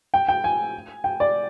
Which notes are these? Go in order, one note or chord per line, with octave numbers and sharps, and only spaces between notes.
G5
G5
G#5
G5
D5